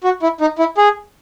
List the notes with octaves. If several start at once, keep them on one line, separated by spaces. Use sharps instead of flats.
F#4
E4
D#4
E4
G#4